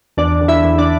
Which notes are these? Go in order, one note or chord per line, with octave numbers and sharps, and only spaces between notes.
E2 D4 D5
D3
E4 E5
E2
D4 D5